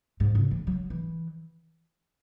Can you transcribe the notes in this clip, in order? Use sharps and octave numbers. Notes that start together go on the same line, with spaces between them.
G#2
C#3
E3
F#3
E3